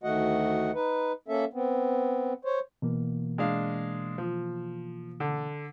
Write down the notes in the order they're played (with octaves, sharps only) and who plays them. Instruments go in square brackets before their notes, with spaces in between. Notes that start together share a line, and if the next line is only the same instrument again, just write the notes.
[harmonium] D2 D#3 A3 F#4 D#5 F#5
D#4 B4
A#3 C#4 A4 E5
B3 C4
C5 C#5
[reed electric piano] B2 E3 A#3
[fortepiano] G#3 D4 F5
F3
D3